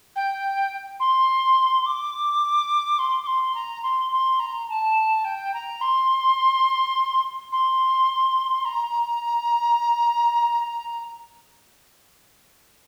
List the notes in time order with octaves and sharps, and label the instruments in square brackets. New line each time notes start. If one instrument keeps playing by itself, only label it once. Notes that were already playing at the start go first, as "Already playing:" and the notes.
[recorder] G5
C6
D6
C6
D6
C6
A#5
C6
C6
A#5
A5
G5
A#5
C6
C6
A#5